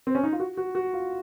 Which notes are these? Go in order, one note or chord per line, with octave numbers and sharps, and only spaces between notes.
C4
C#4
D#4
F4
F#4
F#4
F#4
F4